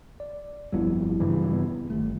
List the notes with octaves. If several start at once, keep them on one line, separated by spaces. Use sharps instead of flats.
D5
G1 F2 G3 B3 E4
G2 C#3 E3
B3
G1 D#3 A3